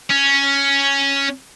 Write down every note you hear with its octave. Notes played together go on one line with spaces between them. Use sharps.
C#4